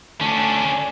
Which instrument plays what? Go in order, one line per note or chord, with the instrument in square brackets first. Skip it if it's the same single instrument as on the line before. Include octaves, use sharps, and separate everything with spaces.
[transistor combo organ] D3 A3 [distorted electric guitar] C#4 D4